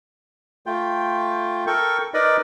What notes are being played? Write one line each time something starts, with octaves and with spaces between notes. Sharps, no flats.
A3 F4 G5
A4 A#4 G5 C#6
D#4 A#4 B4 D5 D#5 B5